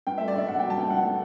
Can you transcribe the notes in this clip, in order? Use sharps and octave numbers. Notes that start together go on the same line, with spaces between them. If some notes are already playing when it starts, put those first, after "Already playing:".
G2 G5
E5
A3
D5
G2 E5
G2 F#5
G5
F#3
A5
G2 G5
G2 F#5
A3